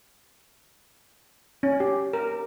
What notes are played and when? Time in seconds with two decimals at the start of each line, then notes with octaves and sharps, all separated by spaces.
1.63 C#4
1.80 G4
2.13 A#4